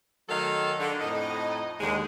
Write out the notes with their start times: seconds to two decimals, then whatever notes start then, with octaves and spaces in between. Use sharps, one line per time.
0.29 D#3 F#3 A3 D#4 A4 F5
0.79 D3
1.01 F2 A2 D#4 D#5
1.80 D#2 D3 G#3